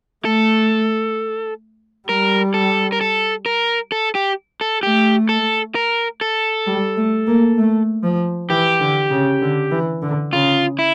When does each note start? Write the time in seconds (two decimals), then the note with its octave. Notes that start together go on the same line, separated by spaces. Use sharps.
0.25 A3 A4
2.08 G3 A#4
2.54 A4
2.92 A#4
3.01 A4
3.46 A#4
3.92 A4
4.15 G4
4.61 A4
4.83 A3 G4
5.29 A4
5.75 A#4
6.21 A4
6.66 G3
6.97 A3
7.27 A#3
7.58 A3
8.03 F3
8.49 E3 G4
8.80 D3
9.11 C#3
9.42 D3
9.71 E3
10.02 D3
10.33 C#3 F4
10.79 E4